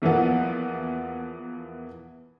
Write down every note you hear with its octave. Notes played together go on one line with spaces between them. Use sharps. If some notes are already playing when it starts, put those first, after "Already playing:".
E2 E3 F3 A#3 B3